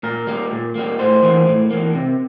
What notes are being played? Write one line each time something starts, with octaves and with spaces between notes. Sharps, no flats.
A#2 A#4
G3 A#3
A#2
G3 A#3
A2 C5
E3 A#3
A2
E3 A#3
C3